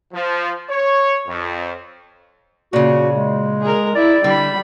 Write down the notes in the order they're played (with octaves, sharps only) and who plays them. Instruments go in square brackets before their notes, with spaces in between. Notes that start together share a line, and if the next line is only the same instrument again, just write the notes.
[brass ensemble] F3
C#5
F2
[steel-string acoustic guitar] A#2 C#3 [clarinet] F#4
[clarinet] G#3
[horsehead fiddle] G#4 A#4
[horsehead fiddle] E4 [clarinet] D5
[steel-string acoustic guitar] D3 [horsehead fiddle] G3 B5